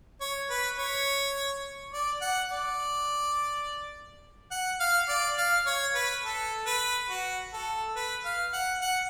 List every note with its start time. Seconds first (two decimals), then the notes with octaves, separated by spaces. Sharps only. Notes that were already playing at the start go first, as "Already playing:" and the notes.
0.21 C#5
0.50 B4
0.78 C#5
1.93 D5
2.22 F#5
2.50 D5
4.51 F#5
4.80 F5
5.09 D5
5.38 F5
5.66 C#5
5.95 B4
6.24 A4
6.67 B4
7.10 F#4
7.53 A4
7.96 B4
8.25 F5
8.53 F#5
8.82 F#5